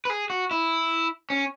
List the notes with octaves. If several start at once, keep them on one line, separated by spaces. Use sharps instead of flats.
B4
G#4
F#4
E4
C#4